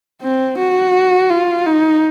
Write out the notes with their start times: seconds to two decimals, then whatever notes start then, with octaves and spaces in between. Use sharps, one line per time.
0.22 C4
0.58 F#4
1.30 F4
1.66 D#4